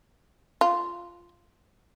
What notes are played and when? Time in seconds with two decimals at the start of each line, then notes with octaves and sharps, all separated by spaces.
0.61 F4